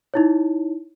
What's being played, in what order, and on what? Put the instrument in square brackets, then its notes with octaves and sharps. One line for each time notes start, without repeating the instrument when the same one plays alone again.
[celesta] D#4 E4 C#5